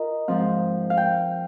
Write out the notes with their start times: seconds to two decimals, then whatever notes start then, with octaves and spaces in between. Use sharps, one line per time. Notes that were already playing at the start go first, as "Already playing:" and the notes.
Already playing: F4 A#4 D#5
0.28 G#2 F3 C4 F5
0.90 F5
0.97 G5